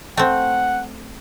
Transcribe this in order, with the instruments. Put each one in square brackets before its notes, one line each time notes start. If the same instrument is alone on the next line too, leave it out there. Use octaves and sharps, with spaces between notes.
[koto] A3 C4 [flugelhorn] F#5